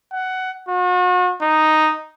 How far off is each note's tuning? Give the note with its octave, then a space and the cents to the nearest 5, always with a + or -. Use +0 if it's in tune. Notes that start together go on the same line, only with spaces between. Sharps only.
F#5 +15
F#4 -40
D#4 +0